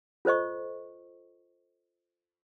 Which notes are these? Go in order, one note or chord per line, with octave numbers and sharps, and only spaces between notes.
F4 A4 C5 D#5 C#6